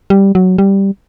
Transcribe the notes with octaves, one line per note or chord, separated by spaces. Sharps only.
G3
F#3
G3